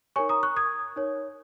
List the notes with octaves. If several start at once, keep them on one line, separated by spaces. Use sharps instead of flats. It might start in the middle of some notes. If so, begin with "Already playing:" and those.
D#4 A#4 C#5 G#5 C#6
A#5 D#6
C#6 F#6
D#6 G#6
D#4 A#4 C#5